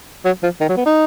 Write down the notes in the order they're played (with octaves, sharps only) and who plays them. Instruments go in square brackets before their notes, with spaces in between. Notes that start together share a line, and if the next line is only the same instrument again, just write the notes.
[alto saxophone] F#3
F3
D#3
F#3
B3
D#4